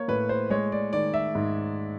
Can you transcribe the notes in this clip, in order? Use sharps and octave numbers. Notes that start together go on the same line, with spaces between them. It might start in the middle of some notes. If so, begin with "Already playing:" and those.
Already playing: A#3 C#5
A2 B4
C5
G#3 C#5
D5
D#3 D5
E5
G#2